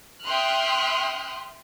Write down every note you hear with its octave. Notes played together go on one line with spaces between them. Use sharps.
E5 G5 C6 D#6 F6 F#6